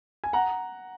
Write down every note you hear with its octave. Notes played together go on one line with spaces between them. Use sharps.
G#5
F#5 A#5